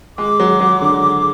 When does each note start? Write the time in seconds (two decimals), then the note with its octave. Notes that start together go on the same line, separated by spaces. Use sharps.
0.18 G#3 D6
0.40 F#3
0.60 F#3
0.81 D3